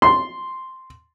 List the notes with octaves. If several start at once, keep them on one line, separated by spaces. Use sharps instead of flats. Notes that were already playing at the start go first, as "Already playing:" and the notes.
C6